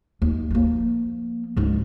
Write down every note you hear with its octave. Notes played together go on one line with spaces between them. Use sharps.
D#2
F3 A#3
C#2 G#2